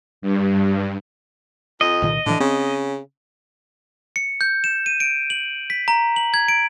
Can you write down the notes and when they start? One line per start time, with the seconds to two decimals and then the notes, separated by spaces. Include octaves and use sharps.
0.22 G2
1.81 F2 D#5
2.02 C2 A#2 D#3
2.26 A2 D3 E3
2.40 C#3 C4
4.16 C#7
4.41 G6
4.64 E7
4.86 D#7
5.00 D7
5.30 F#7
5.70 B6
5.88 A#5
6.16 F#7
6.34 G#6
6.48 D7